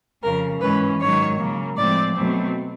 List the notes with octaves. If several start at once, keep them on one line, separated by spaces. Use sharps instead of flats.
F2 C#3 F3 A#4
G#2 E3 G#3 C#4 B4
G#2 D#3 F#3 C#5
C#3 F#3 A#3
A2 F3 G#3 C4 D5
B2 F#3 A3 C4